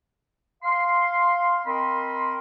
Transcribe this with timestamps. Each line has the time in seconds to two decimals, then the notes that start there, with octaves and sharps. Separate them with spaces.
0.63 F5 C6
1.66 C4 A#4 D#5 B5 C6